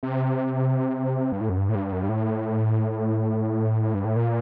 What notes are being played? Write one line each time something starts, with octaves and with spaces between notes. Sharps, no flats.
C3
G2
A2
F#2
G2
A2
G2
F#2
G2
A2
G2
A2
A#2